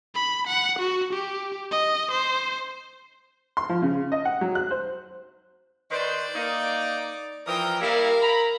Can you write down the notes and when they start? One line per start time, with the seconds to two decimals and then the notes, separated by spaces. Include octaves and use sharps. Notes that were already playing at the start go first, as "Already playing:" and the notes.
0.15 B5
0.48 F#5
0.80 F#4
1.14 G4
1.71 D#5
2.12 C5
3.57 C6
3.69 F3
3.82 C#3
4.12 D#5
4.25 F#5
4.41 F#3
4.55 F#6
4.71 C5
5.91 D#3 B4 C5 D5
6.35 A#3 D#4
7.46 E3 F3 A#4 G5 D#6
7.81 G3 A#3 E4 A#4 F5
8.22 A#5 B5